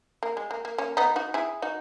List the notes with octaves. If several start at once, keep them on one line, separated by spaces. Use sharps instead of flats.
A#3
G#3
A#3
A#3
A#3 C#4
B3 D#4
D#4 F#4
E4 G#4
D#4 F#4